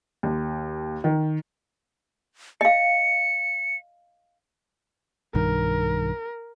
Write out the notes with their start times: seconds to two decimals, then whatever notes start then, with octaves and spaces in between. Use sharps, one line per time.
0.23 D#2
1.04 D#3
2.61 D#5 F5 C#7
5.35 B1 G2 D#3 A#4